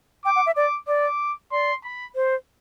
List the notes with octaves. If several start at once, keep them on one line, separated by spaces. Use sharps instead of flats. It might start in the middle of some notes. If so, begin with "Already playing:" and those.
G5 D6
F#5
E5
D5 D6
D5 D6
D5 C6
B5
C5